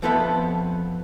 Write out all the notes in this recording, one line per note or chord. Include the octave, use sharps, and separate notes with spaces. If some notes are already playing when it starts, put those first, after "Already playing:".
F2 F3 B3 A4 B4 E5